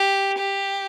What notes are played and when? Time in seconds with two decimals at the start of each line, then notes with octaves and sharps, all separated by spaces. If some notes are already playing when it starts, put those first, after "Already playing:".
Already playing: G4
0.38 G4